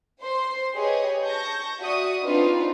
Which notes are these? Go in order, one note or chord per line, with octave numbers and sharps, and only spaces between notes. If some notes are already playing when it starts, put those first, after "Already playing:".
C5 C6
G4 G#4 B4 C#5 D#5
A5 C#6 G6 A#6
F#4 D5 E5 C#6 D#6
B3 C4 D4 D#4 F4 B4